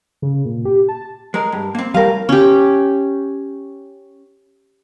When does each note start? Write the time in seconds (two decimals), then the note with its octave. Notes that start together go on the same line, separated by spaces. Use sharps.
0.22 C#3
0.45 A#2
0.65 G4
0.88 A5
1.34 G#3 A#4
1.52 G2
1.75 A#3 C4
1.94 A2 G3 A#4 F5
2.29 C#4 G4